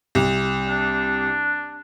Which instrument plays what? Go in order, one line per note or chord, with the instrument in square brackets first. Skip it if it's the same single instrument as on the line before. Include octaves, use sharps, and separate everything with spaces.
[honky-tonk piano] C2
[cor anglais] D4